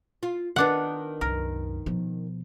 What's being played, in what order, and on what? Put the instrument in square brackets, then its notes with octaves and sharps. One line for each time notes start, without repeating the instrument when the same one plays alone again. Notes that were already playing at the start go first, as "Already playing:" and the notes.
[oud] F4
[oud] D#3 B3 [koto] D4 F#5
[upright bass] C2 F#2 [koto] A#4
[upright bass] B2 F3